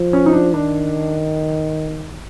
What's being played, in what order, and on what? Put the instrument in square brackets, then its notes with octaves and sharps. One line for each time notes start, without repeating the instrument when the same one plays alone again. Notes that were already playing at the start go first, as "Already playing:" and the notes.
Already playing: [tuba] F3
[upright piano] C#4
D#4
D4
[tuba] D#3 [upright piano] D4